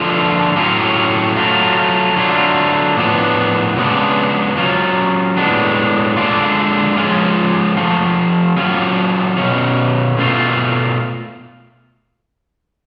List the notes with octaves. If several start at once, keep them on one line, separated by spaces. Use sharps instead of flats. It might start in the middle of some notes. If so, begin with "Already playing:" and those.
Already playing: D3 F3 A3 F4
A2 F#3 C#4 F4
F#3 A3 F4
D3 F#3 A3 F4
A2 F3 B3 D4
C#3 G#3 B3 D4
F#3 C#4 F4
A2 G#3 B3 D4
D3 G#3 D4 F4
F3 G#3 C#4 F4
F3 A3 F4
F#3 C#4 F4
B2 F#3 C#4
B2 A3 F4